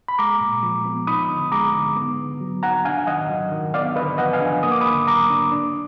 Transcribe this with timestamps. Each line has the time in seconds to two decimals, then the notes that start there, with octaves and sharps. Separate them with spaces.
0.08 B5
0.19 G#3 A#5 D6
0.40 A#2
0.63 F3
0.85 B3
1.07 D#4 B5 D#6
1.29 D3
1.52 G#3 A#5 D6
1.74 D3
1.96 B3
2.19 D3
2.40 F#3
2.63 D#4 F#5 A#5
2.85 D4 F5 G#5
3.07 D#3 D#5 F#5
3.30 F#3
3.52 D#3
3.74 B3 D5 F5
3.96 D3 B4 D#5
4.18 F3 D#5 F#5
4.33 F5 G#5
4.41 D4
4.63 A#3 D#6
4.72 D6
4.81 B5 D#6
4.86 D3
5.07 F#3 A#5 D6
5.30 D4
5.52 D4